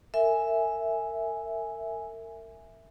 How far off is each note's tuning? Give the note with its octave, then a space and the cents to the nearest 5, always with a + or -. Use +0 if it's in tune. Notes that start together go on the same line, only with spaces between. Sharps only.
A#4 -35 E5 +0 G#5 +0